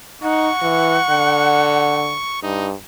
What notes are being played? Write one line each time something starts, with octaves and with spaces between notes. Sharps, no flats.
D#4 F#5 C#6
E3
D3
G2 D#4